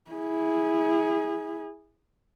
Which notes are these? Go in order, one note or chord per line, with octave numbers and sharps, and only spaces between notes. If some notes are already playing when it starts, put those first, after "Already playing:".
E4 G#4